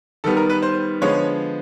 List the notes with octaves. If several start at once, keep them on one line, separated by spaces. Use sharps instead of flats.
D#3 G3 B3 A4
A#4
B4
C5
D3 F3 G#3 B3 C#5